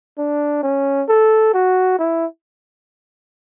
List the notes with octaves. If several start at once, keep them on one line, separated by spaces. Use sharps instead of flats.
D4
C#4
A4
F#4
E4